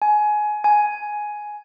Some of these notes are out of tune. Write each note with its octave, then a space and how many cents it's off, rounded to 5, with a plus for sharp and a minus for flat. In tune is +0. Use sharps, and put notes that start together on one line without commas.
G#5 +20
G#5 +5